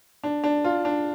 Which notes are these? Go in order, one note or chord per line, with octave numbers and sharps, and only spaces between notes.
D4
D4
F4
D4